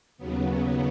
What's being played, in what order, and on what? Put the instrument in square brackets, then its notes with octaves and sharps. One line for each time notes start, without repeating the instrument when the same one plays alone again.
[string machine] D#2 C#3 F#3 B3